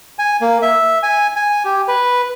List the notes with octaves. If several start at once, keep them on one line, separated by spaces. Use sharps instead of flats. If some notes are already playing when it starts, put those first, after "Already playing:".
G#5
A#3
E5
G#5
G#5
G4
B4